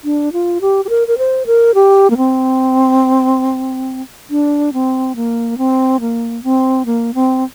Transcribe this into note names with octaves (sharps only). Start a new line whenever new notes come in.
D4
F4
G4
G4
A#4
A#4
C5
A#4
G4
A#3
C4
D4
C4
A#3
C4
A#3
C4
A#3
C4